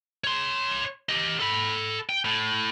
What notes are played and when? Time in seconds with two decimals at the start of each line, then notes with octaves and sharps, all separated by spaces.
0.24 C#5 C6
1.09 G4 D#5
1.40 A4 B5
2.09 G5
2.25 A2